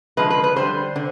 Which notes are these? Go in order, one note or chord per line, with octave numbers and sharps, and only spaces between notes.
D3 F3 G#3 B4
B4
B4
D3 G3 C5
D3